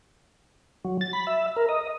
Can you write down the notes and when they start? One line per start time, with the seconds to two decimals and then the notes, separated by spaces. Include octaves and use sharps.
0.85 F#3
1.01 A6
1.13 B5
1.27 E5
1.56 A#4
1.69 D#5